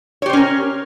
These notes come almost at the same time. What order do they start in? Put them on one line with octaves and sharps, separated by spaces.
C#5 G4 C5 C#4 A#4